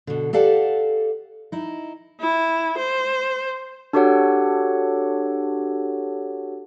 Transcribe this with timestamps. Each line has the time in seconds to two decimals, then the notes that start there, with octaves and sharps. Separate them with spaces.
0.07 B2 D3
0.33 G4 A4 D5 F5 F#5 A5
1.52 D#4 E4
2.21 E4
2.78 C5
3.93 D4 F#4 G4 A4 C#5 F#5